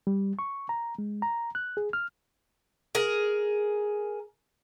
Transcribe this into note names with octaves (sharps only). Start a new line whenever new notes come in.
G3
C#6
A#5
G#3
A#5
F#6
G#4
F6
G#4 A#4